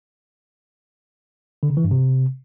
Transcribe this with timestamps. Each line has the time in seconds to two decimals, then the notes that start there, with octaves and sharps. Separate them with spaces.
1.63 D3
1.70 C#3
1.77 E3
1.84 G2
1.91 C3